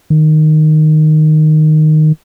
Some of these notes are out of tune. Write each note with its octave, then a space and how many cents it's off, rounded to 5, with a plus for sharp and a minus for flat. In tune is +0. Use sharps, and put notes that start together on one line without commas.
D#3 -10